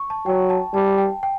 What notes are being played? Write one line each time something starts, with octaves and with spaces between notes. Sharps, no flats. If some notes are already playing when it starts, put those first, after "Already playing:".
Already playing: C#6
A5
F#3 G5
A5
G3 A5
G5
G5